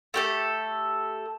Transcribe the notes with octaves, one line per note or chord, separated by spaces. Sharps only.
A3 G4 A4